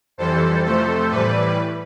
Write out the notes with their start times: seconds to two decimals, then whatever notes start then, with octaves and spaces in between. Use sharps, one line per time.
0.18 F2 E3 G3 A4 C5
0.64 F2 C3 F3 A3 A4 C5
1.11 A2 E3 G3 B4 D5